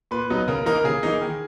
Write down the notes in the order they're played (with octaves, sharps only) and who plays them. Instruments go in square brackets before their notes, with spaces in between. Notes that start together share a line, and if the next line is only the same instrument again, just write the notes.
[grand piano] A#2 B4
F#3 B3 D#4
C#3 A#4
E3 A#3 D#4 A#4
C#3 G#4
E3 A#3 D#4
D#3